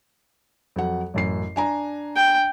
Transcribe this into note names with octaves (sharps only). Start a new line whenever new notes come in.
F2 F#3 F#5
A1 F#2 C7
D4 G#5 A#5
G5